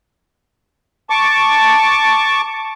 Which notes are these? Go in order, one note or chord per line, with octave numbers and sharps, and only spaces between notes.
A5 C#6 D6